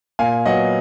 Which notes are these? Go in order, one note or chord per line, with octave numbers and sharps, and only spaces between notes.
A#2 F5 G#5
F#3 B3 D#5 F#5